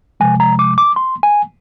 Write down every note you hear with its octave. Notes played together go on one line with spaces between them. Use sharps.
C3 F3 G#3 G#5
A#5
D6
D6
C6
G#5